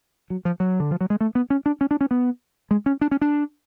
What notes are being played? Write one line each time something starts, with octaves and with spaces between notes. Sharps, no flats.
F#3
F3
F#3
D3
F3
F#3
G#3
A3
B3
C#4
D4
C#4
D4
C#4
B3
G#3
C#4
D4
C#4
D4